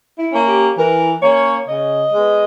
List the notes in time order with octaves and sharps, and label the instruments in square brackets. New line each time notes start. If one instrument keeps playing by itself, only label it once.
[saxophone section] E4
A#3 C#4
G4
E3 A#4
A#3 C#4 C#5
C#3 D#5
G#3 B3